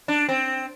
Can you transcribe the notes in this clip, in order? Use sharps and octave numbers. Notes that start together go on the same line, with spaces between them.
D4
C4